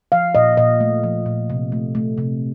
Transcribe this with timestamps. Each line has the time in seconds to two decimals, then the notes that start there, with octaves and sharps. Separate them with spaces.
0.12 F3 F5
0.35 A#2 D#5
0.57 A#2 D#5
0.80 A3
1.04 F3
1.26 A#2
1.50 C3
1.72 A3
1.95 A3
2.18 C3